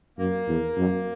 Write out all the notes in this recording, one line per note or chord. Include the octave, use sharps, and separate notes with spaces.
F#2 A#3
E2
F#2